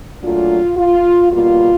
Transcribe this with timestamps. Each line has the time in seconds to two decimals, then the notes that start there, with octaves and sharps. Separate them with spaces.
0.22 A#2 F#3 A3 D4 F4
0.77 F4
1.32 B2 G3 A#3 F4